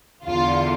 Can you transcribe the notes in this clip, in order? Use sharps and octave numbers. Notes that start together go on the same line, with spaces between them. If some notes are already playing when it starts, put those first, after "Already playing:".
E2 D3 F4